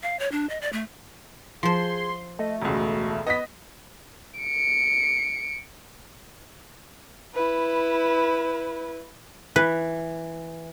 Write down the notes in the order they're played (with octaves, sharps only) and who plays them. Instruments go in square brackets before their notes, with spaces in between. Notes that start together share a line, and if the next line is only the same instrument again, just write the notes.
[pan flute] F5
C#5
D4
D#5
D5
A3
[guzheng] F3 C5 [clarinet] G#4 [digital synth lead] C6
[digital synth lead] A3 [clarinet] D#5
[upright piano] E1 C#2 [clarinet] F#4
[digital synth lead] B3 [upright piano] D#5 A#6 B6
[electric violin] C#7 D7
[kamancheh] E4 B4
[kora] E3 [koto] B4